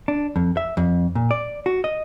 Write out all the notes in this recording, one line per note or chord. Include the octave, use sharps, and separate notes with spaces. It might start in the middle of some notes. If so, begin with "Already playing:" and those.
D4
F2
E5
F2
A#2
D5
F#4
D#5